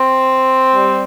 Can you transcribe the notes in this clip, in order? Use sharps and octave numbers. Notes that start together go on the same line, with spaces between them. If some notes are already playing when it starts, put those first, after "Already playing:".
Already playing: C4
G3